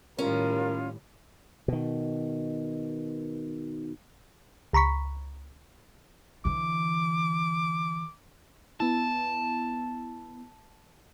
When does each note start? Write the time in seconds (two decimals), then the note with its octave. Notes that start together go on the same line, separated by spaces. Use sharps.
0.19 A2 D#3 G3 C#4 F4 A#4
1.68 B2 D#3
4.73 C#2 A#5 B5 C#6 B6
6.45 D3 E3 D6
8.80 B3 E4 A5